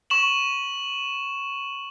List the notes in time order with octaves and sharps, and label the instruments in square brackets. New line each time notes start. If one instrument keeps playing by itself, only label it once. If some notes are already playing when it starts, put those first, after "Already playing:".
[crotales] C#6 E7 F#7